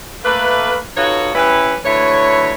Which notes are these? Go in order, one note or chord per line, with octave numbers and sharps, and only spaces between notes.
A3 A#3 B4
D#4 F4 F#4 A4 B4 C#5
G3 C#4 E4 B4
D2 E4 B4 C#5